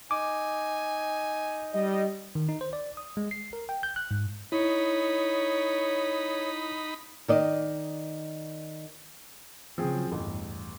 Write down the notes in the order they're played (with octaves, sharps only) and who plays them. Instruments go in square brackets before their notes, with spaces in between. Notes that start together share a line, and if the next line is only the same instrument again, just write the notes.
[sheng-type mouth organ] D#4 [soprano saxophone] G#5 [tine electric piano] D6
[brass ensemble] G3 D#5
[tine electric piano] D#3
D#4
C5
D5
D#6
G#3
C7
A#4
G5
G6
F#6
G#2
[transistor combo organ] D#4 B5 [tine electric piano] E4 [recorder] C#5
[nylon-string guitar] D#3 D5 D#5
[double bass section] C#3 F#3 [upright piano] F3 C4 G#4
[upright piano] A1 [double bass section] E2 G2